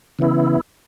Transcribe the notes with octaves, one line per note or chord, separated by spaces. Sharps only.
C#3 E3 B3 E4